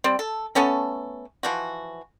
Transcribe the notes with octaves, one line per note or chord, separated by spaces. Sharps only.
G3 C4
A4
A3 B3 C#4 A4
E3 F3 F#4